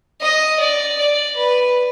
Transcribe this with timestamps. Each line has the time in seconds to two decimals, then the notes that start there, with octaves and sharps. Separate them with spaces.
0.21 D#5
0.60 D5
0.99 D5
1.37 B4